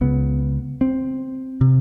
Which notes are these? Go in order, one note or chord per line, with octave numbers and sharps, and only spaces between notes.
C#2 C#3 B3
C4
C3